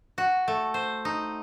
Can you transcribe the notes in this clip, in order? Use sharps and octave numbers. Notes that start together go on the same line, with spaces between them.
F#4
A3
C5
D#4